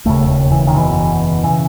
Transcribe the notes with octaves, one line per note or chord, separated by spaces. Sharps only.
E1 D#2 C#3 A3
E3
D#3
F#1 E2 B2 E3
C#3 E3